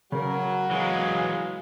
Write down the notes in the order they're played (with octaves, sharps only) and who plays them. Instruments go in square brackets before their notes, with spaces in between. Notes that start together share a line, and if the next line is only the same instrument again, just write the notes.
[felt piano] C#3 [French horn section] F#3 [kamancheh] A#4
[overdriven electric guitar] E3 G#3 [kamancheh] G#4 F5